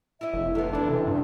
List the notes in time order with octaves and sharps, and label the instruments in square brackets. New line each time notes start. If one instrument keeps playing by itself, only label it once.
[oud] E4 D#5 [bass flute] E5
[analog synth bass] F1
[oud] C3 A#3 B3 [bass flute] A4
[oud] C#3 E3 [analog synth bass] D4
[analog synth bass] C3 [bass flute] C#4
[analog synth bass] G2 [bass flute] D4